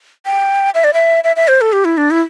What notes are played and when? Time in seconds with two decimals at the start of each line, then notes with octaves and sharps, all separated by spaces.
0.26 G5
0.75 E5
0.84 D5
0.93 E5
1.24 E5
1.36 E5
1.48 C5
1.61 A4
1.73 G4
1.85 E4
1.97 D4
2.11 E4